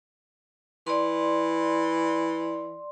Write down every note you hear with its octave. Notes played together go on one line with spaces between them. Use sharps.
E3 D5 C6